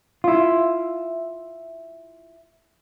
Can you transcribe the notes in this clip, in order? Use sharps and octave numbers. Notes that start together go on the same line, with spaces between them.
E4 F4